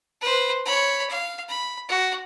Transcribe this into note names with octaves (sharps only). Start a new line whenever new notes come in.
B4 C5
C#5 B5
F5
B5
F#4